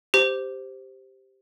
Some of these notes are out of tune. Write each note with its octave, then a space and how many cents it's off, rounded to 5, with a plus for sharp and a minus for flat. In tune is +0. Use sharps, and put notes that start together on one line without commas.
G4 +0 C5 -5